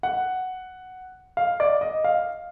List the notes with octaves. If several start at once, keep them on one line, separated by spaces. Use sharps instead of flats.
F#5
F5
D5
D#5
F5